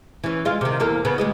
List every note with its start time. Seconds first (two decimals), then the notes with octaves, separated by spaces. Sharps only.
0.24 E3 C#4
0.45 G#3 F4
0.61 C3 D#3
0.80 E2 A#3 A4
1.05 C#3 B3
1.18 D2 G#3 D#5